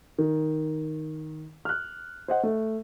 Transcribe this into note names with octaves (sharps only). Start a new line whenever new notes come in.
D#3
F6 F#6
C5 D#5 F#5
A3